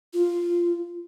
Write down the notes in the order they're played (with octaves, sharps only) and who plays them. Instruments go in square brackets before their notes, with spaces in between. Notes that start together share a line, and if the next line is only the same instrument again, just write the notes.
[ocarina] F4